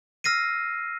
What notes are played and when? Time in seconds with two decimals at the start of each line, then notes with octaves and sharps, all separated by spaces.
0.24 E6 F6 A#6 C7 D#7